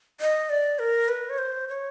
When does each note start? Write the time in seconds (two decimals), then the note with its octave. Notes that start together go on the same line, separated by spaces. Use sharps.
0.20 D#5
0.50 D5
0.79 A#4
1.08 B4
1.29 C#5
1.38 C5
1.69 C#5